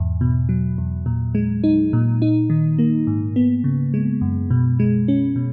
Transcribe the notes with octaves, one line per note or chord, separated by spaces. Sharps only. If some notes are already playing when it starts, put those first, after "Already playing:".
Already playing: E2 G#2
B2
F#3
E2
A#2
G#3
D#4
A#2
D#4
D#3
A#3
G#2
B3
C#3
G#3
F#2
B2
G#3
C#4
B2